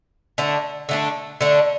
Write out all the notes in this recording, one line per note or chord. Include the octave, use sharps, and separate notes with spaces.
D3 A3 D4
D3 A3 D4
D3 A3 D4